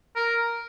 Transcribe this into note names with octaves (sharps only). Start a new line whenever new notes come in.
A#4